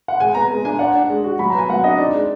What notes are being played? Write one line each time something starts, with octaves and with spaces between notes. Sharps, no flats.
F#5
G#3 G#5
B3 A#5
G#3
D4 G#5
D5 F#5
D4
G#3
F#4
F#3 B5
A#5
B3 G#5
F#3 F#5
D4 D#5
D#4 D5
G#3